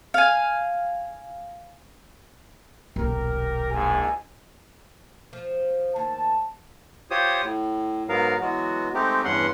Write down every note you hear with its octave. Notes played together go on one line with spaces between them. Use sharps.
F5 G#5
D#1 B1 G4 A#4
A#1 G#2 G#5
F3
D#2 A5
F4 G4 C5 C#5 D#6
A2
G#2 F#3 B3 A#4 F5
E3 F#3 G#3 B3 F#4
G#3 A3 C4 D#4 G4
E2 G2 C#4 F#5 C6